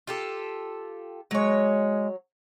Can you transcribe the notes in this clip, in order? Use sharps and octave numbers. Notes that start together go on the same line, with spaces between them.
F4 G4 A4
F#3 G#3 C#5